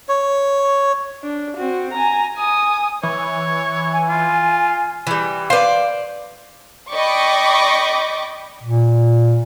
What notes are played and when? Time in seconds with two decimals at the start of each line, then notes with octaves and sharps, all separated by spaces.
0.09 C#5
1.23 D4
1.56 C4 F#4
1.92 G#5 A#5
2.35 G#5 D#6
3.03 E3 C#5
3.92 G#5
4.09 F4
5.07 E3 G3
5.50 B4 C5 D5 F5
6.91 D5 D#5 G5 B5 C#6 D6
8.63 A#2